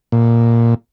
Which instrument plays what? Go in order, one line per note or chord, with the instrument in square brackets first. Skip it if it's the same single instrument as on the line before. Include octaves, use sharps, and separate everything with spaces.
[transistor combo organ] A#2